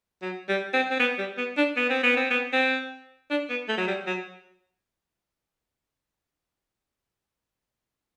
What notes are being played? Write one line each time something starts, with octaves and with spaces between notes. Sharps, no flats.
F#3
G3
C4
C4
B3
G3
B3
D4
B3
C4
B3
C4
B3
C4
D4
B3
A3
F#3
G3
F#3